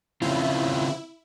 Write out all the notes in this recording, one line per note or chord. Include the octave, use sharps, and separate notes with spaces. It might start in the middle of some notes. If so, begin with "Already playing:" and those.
C#3 C4 E4 F4